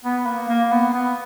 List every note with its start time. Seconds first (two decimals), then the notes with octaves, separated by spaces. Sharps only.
0.05 B3
0.26 A#3
0.49 A#3
0.72 B3
0.94 B3